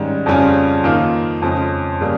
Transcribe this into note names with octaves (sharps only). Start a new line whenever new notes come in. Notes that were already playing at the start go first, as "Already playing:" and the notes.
Already playing: G#2 D#3 G3 C#4
F2 C#3 G3 C#4 F4
D#3 A#3 F4
F2 C#3 G#3
C#3 G3 A#3